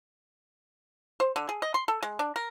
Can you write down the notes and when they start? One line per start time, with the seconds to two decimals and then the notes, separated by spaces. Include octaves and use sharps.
1.20 C5
1.36 D3
1.49 G#4
1.62 D#5
1.74 C6
1.88 A4
2.03 G#3
2.19 D4
2.36 A#4